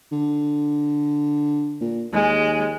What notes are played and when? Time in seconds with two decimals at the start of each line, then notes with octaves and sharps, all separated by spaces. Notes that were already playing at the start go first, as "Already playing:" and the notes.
0.12 D3
1.81 A#2
2.13 D#2 G#3